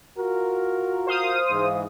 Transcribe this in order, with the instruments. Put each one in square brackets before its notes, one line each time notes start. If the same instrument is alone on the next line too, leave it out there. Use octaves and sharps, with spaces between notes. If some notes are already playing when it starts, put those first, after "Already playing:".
[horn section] F4 F#4 A#4
[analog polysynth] C5 F5 D#6
[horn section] G#2 E3